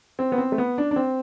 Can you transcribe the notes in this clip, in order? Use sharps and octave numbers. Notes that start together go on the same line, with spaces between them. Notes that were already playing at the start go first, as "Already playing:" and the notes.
C4
B3
C4
A3
B3
D4
D4
C4